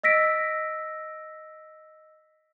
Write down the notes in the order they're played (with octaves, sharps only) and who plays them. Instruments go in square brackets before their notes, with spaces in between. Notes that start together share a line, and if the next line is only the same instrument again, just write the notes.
[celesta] D#5 E6 A#6 B6 D7